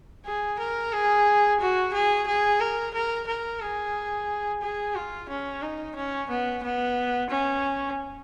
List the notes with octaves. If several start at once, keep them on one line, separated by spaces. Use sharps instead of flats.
G#4
A#4
G#4
F#4
G#4
G#4
A#4
A#4
A#4
G#4
G#4
F4
C#4
D#4
C#4
B3
B3
C#4